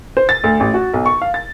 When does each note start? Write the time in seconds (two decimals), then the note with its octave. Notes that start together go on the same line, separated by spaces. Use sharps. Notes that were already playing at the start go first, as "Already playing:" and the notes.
0.17 C5
0.29 A6
0.44 D2
0.60 A1
0.74 F#4
0.94 B1
1.06 C#6
1.22 F5
1.34 A6